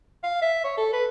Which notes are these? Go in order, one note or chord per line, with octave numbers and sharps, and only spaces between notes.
F5
E5
C#5
A4
B4